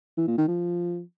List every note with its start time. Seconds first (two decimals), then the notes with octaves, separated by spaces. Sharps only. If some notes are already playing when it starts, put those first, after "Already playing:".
0.17 E3
0.27 A#2
0.38 D#3
0.48 F3